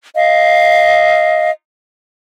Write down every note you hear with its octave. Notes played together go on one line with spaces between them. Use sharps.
D#5 F5